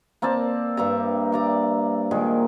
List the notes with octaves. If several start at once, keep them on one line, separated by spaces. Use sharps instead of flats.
A#3 C4 D5 A5
G2 D5 E5 A#5
D5 A#5 D6
A#2 D#3 G#3